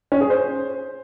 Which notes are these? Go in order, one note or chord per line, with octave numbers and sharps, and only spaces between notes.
C#4
G#4
C5